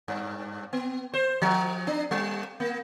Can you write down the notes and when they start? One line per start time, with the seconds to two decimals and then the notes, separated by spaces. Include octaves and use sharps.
0.08 G2
0.73 B3
1.14 C5
1.42 F3
1.87 D4
2.11 G3
2.60 A#3